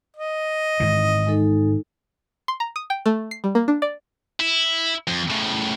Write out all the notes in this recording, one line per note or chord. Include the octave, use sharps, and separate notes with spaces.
D#5
G#2 D#3 E3
G#3 D#4 A4
C6
A#5
D#6
G5
A3
C7
G3
A#3
D4
D5
E4
F2
A2 C#3